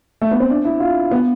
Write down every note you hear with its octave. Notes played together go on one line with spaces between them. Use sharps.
A3
B3
C4
D4
E4
F4
B3